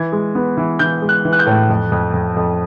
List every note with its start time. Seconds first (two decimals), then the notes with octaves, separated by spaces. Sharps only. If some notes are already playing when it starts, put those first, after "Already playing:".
Already playing: E3 G#6
0.12 G#3
0.35 B3
0.57 E3
0.79 E3 G6
1.02 G#3
1.09 F#6
1.25 E3
1.33 F#6
1.39 G6
1.46 A2
1.70 F2
1.92 F2
2.14 F2
2.37 F2